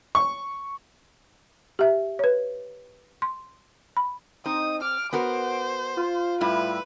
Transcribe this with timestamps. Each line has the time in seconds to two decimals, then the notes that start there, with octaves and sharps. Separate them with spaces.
0.15 C#6
1.79 G4 E5
2.19 B4 C#5
3.22 C6
3.97 B5
4.46 C4 D#4 D#6
4.82 D6 F6
5.13 B3 F#4 A#4 C5
5.97 F4
6.41 A2 G3 E4 B4